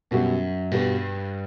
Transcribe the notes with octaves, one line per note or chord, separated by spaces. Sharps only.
F#2 B2 G3 B3 F#4
G2 B2 G3 B3 F#4